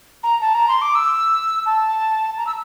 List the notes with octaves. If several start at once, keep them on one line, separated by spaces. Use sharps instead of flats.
A#5
A5
A#5
C6
D6
E6
A5
A#5
E6